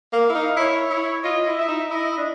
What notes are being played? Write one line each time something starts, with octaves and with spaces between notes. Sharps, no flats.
A#3
F5
E4
D#4
E4 C#5
E4
F4 D#5
E4
E4 E5
D#4
E4 D#5
D4